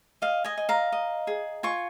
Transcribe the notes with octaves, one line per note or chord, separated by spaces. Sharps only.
D#5 F5
D#5 G#5
D#5
F5 A#5
D#5
G#4
F4 G#5 C#6